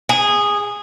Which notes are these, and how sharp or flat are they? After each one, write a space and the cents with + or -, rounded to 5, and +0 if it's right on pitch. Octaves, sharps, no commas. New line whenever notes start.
G#4 -10